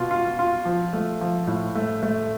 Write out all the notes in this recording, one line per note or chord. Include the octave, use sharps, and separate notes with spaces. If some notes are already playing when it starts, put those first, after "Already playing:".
Already playing: B2 F4
F4
F4
F3
A3
F3
A2
A3
A3